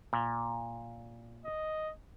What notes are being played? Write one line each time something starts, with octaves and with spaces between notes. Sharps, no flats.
A#2
D#5